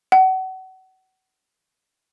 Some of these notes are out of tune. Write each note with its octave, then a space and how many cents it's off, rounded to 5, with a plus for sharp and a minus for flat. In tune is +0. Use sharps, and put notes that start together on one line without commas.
F#5 +30